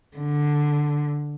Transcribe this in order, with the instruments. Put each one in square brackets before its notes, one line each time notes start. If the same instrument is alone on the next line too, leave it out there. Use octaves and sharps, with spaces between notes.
[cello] D3